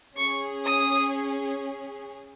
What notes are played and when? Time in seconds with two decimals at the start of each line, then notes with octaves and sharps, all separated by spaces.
0.16 C#4 G#4 C#6
0.66 D#6